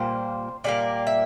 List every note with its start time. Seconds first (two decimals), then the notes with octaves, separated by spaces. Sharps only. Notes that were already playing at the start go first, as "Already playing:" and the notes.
Already playing: A#2 G3 A#3 C5
0.64 A#2 G3 A#3 D5
1.07 E5